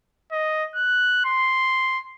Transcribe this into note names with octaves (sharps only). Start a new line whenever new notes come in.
D#5
F#6
C6